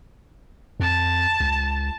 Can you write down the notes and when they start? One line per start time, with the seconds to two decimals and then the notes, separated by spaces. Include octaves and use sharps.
0.80 F2 A5
1.40 C#2